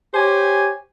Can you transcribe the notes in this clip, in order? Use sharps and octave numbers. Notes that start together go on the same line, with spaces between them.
G4 C5 C#5 G#5